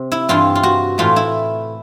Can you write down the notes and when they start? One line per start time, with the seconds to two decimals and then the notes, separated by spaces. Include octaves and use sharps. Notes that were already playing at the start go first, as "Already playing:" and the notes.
Already playing: C3
0.12 E4
0.29 G2 E3 G3 F4
0.55 F4
0.63 F#4
0.98 A2 E3 A3 F4
1.16 E4